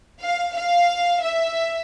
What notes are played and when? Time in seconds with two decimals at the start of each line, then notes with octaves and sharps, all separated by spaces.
0.20 F5
0.54 F5
1.22 E5